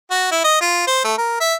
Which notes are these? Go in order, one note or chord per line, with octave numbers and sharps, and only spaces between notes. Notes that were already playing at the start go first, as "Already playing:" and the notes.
F#4
E4
D#5
F4
C5
A3
A#4
E5